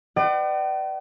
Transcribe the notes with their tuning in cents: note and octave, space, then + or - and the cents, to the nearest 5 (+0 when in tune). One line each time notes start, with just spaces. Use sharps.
B4 +40 D5 +40 G5 -45